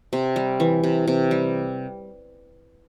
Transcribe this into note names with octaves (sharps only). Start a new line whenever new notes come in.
C3
G3
E3
C3
C3
G3